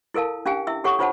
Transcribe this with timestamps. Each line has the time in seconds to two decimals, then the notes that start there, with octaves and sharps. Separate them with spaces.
0.14 E4 A4 A#4 F5 A5
0.46 C#4 D4 G4 F5 G5 G#5
0.67 E4 E5 E6
0.84 G4 A4 C#5 F#5 C#6
0.99 D4 F4 C5 C#5 F#5 A5